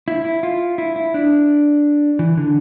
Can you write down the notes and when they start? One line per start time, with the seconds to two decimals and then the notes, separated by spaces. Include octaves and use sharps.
0.08 E4
0.25 E4
0.43 F4
0.78 E4
0.96 E4
1.14 D4
2.19 E3
2.37 D3